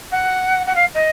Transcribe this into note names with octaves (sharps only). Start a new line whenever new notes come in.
F#5
F#5
F5
D#5